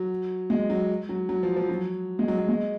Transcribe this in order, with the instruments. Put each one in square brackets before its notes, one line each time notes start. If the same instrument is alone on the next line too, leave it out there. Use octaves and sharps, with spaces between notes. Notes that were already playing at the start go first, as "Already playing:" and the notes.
Already playing: [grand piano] F#3
G#3
F#3
F#3
F#3
F3
F3
F#3
G#3
F#3
F#3
G#3